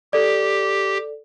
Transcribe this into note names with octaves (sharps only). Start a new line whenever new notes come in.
G4 A4 D5